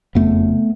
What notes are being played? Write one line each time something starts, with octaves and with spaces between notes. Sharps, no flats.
F#1 F2 C#3 A3 B3